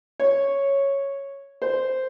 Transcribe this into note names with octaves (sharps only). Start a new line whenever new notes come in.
C#5
C5